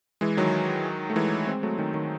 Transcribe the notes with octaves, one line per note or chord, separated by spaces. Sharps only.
E3 G#3
D#3 F#3
A3
E3 G#3
G#3 C4
F#3 A3
D#3 F#3
D#3 F#3